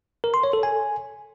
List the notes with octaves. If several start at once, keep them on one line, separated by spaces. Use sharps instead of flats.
A#4
C6
C#5
A4
G#5